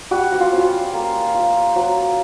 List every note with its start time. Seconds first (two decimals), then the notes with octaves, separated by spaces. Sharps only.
0.11 G3 F#4
0.32 F#4
0.40 F4
0.53 C#4
0.58 F4
0.93 A#3
1.35 F4
1.76 F#3